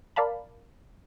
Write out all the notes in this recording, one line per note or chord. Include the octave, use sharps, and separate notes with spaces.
A#4 D5 F5 A5 B5